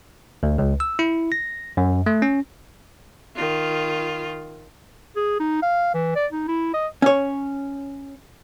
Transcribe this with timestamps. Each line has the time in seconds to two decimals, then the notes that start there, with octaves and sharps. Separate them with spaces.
0.43 D2
0.58 C#2
0.80 E6
0.99 E4
1.32 A#6
1.77 F#2
2.06 A3
2.22 C#4
3.36 D#3 F4
5.16 G#4
5.40 D#4
5.62 F5
5.94 E3
6.15 D5
6.32 D#4
6.48 E4
6.74 D#5
7.02 C#4 C#5